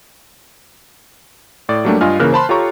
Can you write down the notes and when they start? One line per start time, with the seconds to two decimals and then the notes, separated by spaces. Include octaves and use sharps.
1.69 A2 D5
1.85 F#3 G3 A3 A#3 D4 G4
2.01 G2 F4 D#5 G#5 F6
2.20 C#3 E3 A#3 A#4 F6 F#6
2.33 C5 A5 B5 C6
2.49 F4 G4 A4 C#5 A#5 C#6